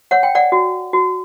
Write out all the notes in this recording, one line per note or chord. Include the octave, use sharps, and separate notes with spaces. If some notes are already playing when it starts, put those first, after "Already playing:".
C#5 F#5
G5
D5 F#5
F#4
F#4